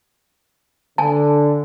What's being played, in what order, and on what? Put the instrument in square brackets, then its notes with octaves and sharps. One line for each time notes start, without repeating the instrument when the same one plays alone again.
[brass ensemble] D3 [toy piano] G#5 A5